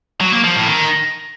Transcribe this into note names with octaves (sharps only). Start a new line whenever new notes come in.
F#3
A#3
F3
A2
D#3